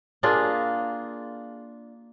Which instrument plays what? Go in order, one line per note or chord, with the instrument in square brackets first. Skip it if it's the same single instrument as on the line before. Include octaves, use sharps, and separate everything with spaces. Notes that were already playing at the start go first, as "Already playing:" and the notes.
[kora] A#3 D4 F4 G#4